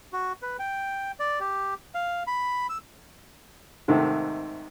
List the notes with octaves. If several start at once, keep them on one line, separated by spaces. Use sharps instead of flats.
F#4
B4
G5
D5
G4
F5
B5
E6
G#2 C3 D#3 A3